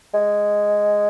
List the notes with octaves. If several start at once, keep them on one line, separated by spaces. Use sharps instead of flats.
G#3